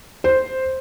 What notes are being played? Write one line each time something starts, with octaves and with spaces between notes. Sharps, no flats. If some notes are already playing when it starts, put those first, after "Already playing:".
C5